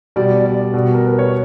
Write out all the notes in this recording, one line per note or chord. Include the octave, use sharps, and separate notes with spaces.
B2 G3 D5
D5
D5
D5
B2 G3
A#4
B4
C#5